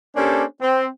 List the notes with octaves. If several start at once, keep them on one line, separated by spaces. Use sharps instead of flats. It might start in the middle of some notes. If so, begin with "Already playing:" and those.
A#3 C#4 D4 G4 A4 C5
C4